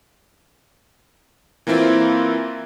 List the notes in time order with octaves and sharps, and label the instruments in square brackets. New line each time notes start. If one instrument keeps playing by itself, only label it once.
[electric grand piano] E3 A#3 C4 E4 F4